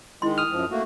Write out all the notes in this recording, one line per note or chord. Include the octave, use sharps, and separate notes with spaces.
D#3 G#3 E4 C6
D#6 F6
F#2 F3
A3 A#3 F#4